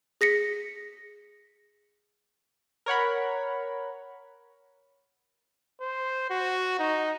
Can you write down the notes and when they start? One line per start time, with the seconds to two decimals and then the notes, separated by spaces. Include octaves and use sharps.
0.21 G#4 A#6 B6 C#7
2.86 A#4 C#5 F#5 B5
5.81 C5
6.30 F#4
6.79 D#4